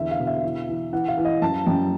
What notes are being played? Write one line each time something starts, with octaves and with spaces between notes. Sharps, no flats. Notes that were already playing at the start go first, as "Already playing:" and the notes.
Already playing: E2 D3 E5
F5
B2
E5
E3
E3
E3 F#5
F5
E3
D#5
F#2 A5
F#2 G5